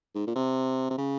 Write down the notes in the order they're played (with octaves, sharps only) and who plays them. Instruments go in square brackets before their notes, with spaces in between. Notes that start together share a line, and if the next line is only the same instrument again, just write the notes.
[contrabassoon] G#2
A#2
C3
C3
C#3